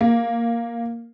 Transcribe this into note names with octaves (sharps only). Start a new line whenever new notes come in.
A#3